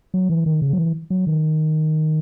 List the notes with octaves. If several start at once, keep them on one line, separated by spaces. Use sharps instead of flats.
F#3
E3
D#3
C#3
F#3
E3
F#3
D#3